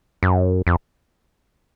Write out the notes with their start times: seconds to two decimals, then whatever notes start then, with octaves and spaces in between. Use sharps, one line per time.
0.23 F#2
0.67 F2